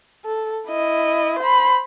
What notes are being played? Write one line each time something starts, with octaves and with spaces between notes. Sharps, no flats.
A4
E4 D#5
C5 B5